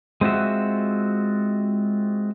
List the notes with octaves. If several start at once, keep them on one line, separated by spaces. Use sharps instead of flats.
G#3 C4 F4 F#4 E5